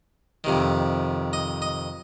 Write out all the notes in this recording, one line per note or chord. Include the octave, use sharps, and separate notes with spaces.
F2 C3 D#3
D#5
D#5